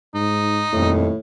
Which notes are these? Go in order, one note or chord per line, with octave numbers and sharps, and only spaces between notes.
G#2 D#4
D#1 F2 A2